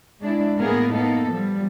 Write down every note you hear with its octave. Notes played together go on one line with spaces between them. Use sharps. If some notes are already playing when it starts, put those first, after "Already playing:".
G#3 D4 E4
A2 A#3 B3 G#4 A#4
A#3 B3 D#4 A4
F3 G3 B3